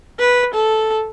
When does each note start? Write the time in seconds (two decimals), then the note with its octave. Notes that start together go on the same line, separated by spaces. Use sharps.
0.19 B4
0.54 A4